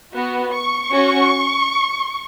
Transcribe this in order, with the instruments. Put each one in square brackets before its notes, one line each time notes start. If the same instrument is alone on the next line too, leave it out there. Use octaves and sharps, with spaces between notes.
[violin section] B3 F#4
C#6
C#4 F#4